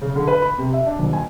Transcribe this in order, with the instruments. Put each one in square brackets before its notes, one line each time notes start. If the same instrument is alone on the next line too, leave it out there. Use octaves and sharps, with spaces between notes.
[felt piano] C#3
D3
B4
B5
C3
E5
D4
D#1
G#5